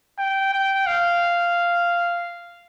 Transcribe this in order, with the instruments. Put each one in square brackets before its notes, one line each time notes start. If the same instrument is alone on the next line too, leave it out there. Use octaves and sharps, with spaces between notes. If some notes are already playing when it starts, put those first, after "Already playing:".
[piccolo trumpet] G5
G5
F5